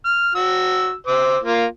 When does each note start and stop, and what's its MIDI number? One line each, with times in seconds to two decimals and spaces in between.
0.05 0.30 89
0.35 0.94 66
0.35 0.94 88
1.07 1.38 72
1.07 1.38 86
1.07 1.38 88
1.43 1.65 58
1.43 1.65 65